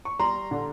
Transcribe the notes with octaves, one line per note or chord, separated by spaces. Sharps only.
C#6
G3 A#5 C6
D3